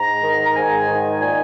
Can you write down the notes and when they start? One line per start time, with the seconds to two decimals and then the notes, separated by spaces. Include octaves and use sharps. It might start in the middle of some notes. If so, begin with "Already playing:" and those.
Already playing: G#2 A#5
0.23 D#3
0.45 A#5
0.55 G#2 G#5
0.88 D#3
1.20 A#2 G#5